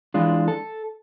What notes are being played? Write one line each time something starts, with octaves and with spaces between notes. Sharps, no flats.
E3 G#3 D4 F4
A4